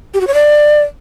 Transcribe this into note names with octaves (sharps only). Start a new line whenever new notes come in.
G4
F#4
C#5
D5